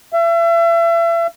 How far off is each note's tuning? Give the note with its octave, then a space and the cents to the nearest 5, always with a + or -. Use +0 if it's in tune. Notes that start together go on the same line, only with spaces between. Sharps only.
E5 +35